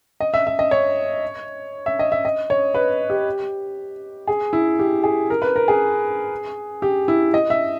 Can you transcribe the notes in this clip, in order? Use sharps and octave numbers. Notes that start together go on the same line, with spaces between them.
D#5
E5
E5
D#5
C#5
E5
D#5
E5
D#5
C#5
B4
G4
G#4
E4
G4
G#4
A#4
B4
A#4
G#4
G4
E4
D#5
E5